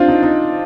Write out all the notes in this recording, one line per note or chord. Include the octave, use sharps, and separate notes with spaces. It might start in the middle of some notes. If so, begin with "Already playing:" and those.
Already playing: C4 D4 F4
D#4
D#4